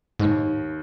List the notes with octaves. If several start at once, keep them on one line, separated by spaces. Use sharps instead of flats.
D#2 G#2 D#3